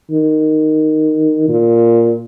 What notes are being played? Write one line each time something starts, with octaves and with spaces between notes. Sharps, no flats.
D#3
A#2